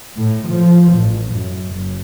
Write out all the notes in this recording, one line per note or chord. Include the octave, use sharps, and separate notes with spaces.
A2
F3
A1
F#2
F#1